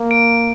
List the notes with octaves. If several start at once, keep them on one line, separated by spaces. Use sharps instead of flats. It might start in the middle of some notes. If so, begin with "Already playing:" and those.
Already playing: A#3
D7